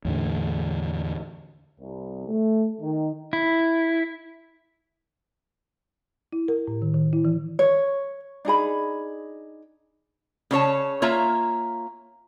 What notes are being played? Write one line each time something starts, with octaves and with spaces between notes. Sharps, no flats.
E2 A2 D3
C2
A3
D#3
E4
E4
A#4
A2
D#3
D#3
E4
E3
C#5
D4 D#4 G#4 B5
C#3 C#4 C#5 A5
A#3 F4 C#5 E5 A#5